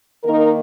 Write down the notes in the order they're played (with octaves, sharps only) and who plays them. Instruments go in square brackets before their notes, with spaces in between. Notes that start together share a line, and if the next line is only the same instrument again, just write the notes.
[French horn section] D#3 A#3 D#4 A#4